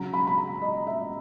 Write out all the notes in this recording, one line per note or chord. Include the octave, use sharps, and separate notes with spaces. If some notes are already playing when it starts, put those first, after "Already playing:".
Already playing: C#3 F#3 A#5
B5
B5
A#5
D#5
E5